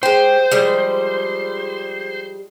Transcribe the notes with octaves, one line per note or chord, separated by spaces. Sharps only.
G#3 G4 C5
F3 G3 G#3